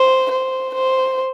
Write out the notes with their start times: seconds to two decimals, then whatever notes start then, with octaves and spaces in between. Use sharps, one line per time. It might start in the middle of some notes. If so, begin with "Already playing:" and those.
Already playing: C5
0.31 C5
0.75 C5